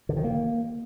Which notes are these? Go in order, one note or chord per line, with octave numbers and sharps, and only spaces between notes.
D3
D#3
A#3